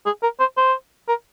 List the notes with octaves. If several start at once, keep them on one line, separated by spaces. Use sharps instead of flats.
G#4
A#4
C5
C5
A#4